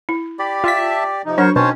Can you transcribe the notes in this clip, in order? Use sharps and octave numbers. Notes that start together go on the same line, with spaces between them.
E4
G4 D5 B5
F4 E5 A5 B6
C3 F3 D#4
F#3 D4 A#4 C5 C#5 C#6
B2 D#3 C#4 C5 C#5 A5